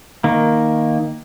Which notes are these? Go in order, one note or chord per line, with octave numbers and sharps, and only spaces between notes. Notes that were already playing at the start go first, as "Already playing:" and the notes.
D#3 A#3